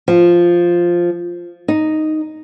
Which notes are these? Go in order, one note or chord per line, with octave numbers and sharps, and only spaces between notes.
F3
D#4